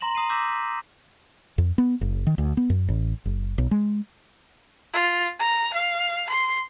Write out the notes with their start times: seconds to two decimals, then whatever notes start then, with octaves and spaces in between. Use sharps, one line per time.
0.01 A#5 C6 A#6 E7 F#7
0.15 A#5 D#6 C7 D#7
0.29 D6 E6 G6 A#6 B6 E7
0.50 B6
1.58 F2
1.78 B3
2.01 F#1
2.27 D#3
2.38 D2
2.57 B3
2.70 F#2
2.89 A1
3.25 F#1
3.58 B1
3.71 G#3
4.93 F4
5.40 A#5
5.74 F5
6.29 C6